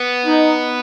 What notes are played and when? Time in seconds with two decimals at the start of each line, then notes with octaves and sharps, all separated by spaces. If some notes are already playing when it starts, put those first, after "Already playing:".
Already playing: B3
0.25 D#4